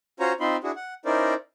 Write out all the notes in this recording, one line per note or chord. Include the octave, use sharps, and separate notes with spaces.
C#4 F4 F#4 C5 C#5 A#5
C4 D#4 F4 B5 C6
D4 E4 F#4 G#4
F#5
C#4 D#4 E4 A#4 C5 D5